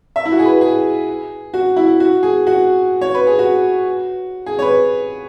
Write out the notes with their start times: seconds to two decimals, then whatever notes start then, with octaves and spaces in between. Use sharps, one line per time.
0.16 E5
0.25 E4
0.32 F#4
0.39 G#4
0.45 B4
0.61 G#4
1.54 F#4
1.76 E4
2.00 F#4
2.23 G#4
2.47 F#4
3.01 C#5
3.15 B4
3.27 G#4
3.39 F#4
4.46 G#4
4.59 C#5
4.62 B4